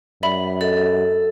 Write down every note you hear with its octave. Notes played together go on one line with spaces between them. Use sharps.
F#2 D5 E5 B5
A4 D#5